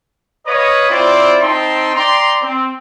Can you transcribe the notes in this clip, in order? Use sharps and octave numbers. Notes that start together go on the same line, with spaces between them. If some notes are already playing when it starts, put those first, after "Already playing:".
B4 C#5 D#5 F5 A#5 D#6
C4 E4 F4 C5 D5
C4 D#4 G5 A5 C6
D5 G5 A#5 C6
C4